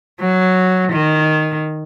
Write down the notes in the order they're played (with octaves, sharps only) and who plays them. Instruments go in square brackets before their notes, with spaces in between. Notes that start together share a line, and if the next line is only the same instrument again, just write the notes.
[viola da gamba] F#3
D#3